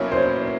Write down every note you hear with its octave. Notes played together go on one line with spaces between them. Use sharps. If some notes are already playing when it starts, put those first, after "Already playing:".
Already playing: B2 F#3 A#3 C#4 E4 C#5
C5
C#5